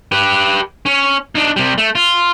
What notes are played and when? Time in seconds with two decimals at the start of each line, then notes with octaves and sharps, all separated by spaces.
0.12 G4 B4
0.86 C#4
1.35 D4 D#4
1.56 C3 G3
1.78 A3
1.95 F4